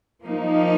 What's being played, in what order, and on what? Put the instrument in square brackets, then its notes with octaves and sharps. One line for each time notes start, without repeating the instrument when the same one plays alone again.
[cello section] F3 A#3 D#4